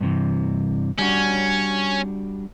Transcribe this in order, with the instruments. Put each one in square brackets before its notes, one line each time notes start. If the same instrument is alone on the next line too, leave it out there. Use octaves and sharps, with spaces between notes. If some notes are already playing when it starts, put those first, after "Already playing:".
[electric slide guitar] G2 C3 E3
[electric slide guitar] G3 D4 F#4 [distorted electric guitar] C#4